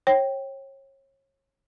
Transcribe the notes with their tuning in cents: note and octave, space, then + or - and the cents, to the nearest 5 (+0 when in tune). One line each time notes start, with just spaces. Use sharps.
C#5 -30 G5 -10